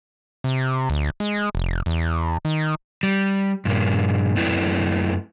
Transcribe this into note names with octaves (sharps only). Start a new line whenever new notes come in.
C3
D2
G#3
F1
E2
D#3
G3
G2 A#2 A#3
F#2 A3 C4 E4 B4 D5